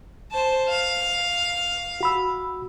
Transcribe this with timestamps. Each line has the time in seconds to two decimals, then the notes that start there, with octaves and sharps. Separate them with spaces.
0.32 C5 A5
0.69 F5
2.01 F#4 B5 E6